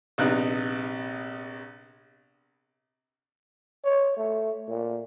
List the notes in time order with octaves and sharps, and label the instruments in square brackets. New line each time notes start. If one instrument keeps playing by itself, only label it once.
[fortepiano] A#1 C3 B3 D#4 F#6
[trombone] C#5
A3
A#2